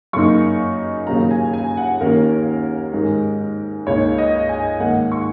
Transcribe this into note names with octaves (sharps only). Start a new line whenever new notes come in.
F#2 C#3 A#3 D#4 C#6
D#2 C#3 F#3 A#3 C#4 A#5
G#5
G#5
F#5
D#2 D#3 A#3 C#4 A#4
G#2 D#3 G#3 A#4
C#2 C#3 A#3 D#4 C#5
D#5
G#5
G#2 D#3 A#3 F#5
C#6